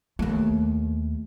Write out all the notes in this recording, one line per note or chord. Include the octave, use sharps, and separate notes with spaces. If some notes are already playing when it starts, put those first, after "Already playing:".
D#2 A3